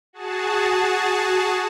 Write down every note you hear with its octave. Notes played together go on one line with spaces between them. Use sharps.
F#4 G#4 A5